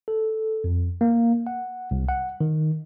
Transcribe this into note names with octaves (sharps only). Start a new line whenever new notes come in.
A4
F2
A#3
F#5
C2
F#5
D#3